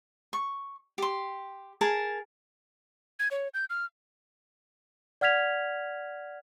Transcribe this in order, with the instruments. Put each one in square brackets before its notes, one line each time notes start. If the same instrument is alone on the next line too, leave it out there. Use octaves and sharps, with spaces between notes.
[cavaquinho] C#6
G4 C6
G#4 A#4 A5 A#5
[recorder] G#6
C#5
G6
F6
[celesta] D5 F#5 F6 G#6 B6 F7